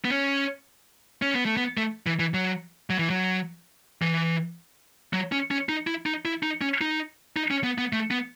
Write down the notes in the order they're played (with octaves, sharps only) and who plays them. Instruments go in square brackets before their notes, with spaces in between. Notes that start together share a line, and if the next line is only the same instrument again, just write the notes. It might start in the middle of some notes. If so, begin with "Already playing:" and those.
[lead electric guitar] B3
C#4
C#4
B3
A3
B3
A3
E3
E3
F#3
F#3
E3
F#3
E3
F#3
C#4
C#4
D#4
E4
D#4
E4
D#4
C#4
D#4
D#4
C#4
B3
B3
A3
B3